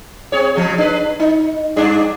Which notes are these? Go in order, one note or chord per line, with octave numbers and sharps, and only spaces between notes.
C4 G#4 C#5
C#3 F3
D4 B4
D#4
G2 D4 G#4